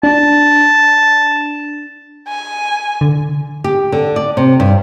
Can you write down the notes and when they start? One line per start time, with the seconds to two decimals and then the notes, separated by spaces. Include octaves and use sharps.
0.03 D4 A5
2.28 G#5
3.01 D3
3.64 G4
3.92 D3
4.16 D5
4.37 C3
4.60 G2